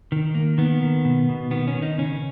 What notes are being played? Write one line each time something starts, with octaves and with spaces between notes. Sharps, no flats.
D#3
A#3
D#3 B3
D#3
B2
B2
D#3 B3
C#4
D#3
D#4
C#3 C#4